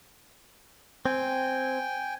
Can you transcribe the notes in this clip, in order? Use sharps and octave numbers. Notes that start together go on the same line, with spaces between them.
C4 G5 G#5